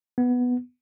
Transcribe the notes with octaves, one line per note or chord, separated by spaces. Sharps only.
B3